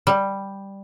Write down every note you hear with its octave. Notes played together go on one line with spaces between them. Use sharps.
G3